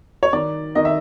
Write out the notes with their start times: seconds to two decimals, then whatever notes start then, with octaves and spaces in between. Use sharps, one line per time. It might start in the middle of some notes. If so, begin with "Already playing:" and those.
0.23 C#5
0.33 D#3 D5
0.75 D#3 D#5
0.85 E5